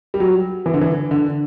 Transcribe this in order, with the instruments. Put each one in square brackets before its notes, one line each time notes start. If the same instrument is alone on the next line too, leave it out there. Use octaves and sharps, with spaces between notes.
[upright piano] G3
F#3
E3
D3
E3
D3